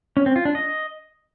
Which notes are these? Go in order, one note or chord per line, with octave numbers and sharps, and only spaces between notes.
C#4
C4
F4
D4
D#5